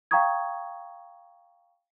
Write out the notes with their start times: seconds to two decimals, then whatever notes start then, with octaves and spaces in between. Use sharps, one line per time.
0.11 F5 G5 A#5 C#6 D#6 G#6